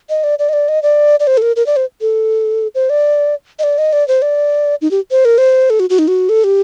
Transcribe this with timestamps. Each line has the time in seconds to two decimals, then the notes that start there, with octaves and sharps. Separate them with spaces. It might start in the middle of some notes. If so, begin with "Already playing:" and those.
0.10 D#5
0.24 D5
0.39 D5
0.49 D#5
0.53 D5
0.68 D#5
0.83 D5
1.20 D5
1.27 C5
1.37 A4
1.42 A#4
1.56 A#4
1.66 D5
1.76 C5
2.01 A4
2.75 C5
2.90 D5
3.59 D#5
3.64 D5
3.78 D#5
3.93 D5
4.08 C5
4.22 D5
4.82 D#4
4.91 G4
5.11 C5
5.25 A#4
5.38 C5
5.70 A4
5.80 F#4
5.90 F#4
5.99 D#4
6.08 F#4
6.29 A4
6.44 G4